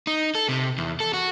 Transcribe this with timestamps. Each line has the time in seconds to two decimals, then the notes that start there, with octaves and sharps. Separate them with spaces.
0.07 D#4
0.35 A4
0.49 C3
0.78 E2
1.00 A4
1.14 F#4